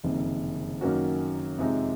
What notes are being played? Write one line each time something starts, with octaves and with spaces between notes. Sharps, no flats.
F#1 F2 C3 D#3
F#2 D#3 A#3 C#4 F#4
F2 C3 F3 G#3 D#4